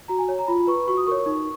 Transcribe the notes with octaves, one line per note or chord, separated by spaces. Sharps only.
F#4 A#5
G#5
C#5
A#5
F4 B5
B4 C#6
F#4 C#6
D#6
A#4 C#5 C#6
D#4